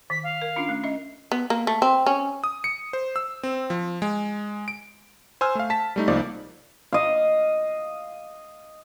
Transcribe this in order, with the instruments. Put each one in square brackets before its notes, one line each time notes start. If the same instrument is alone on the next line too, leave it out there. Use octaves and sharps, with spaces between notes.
[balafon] D#3 [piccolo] B6
[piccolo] F5
[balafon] A#4
C#4 D4 F4
A3 C#4
C#4 D#5 E5
[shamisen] B3
A#3
A3
C4
C#4
[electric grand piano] D#6
C#7
C5
E6
C4
F3
G#3
D7
C5 G#5 E6 F6
A3 F5
A5 B6
G3 A3 D#4
C2 F3 A#3 D#4 D5
[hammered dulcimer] D#5 F5